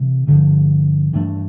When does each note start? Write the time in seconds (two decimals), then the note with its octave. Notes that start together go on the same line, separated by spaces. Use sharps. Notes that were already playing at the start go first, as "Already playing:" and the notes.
Already playing: C3 E3
0.27 G2 D3 F3
1.13 G2 E3 A3 D4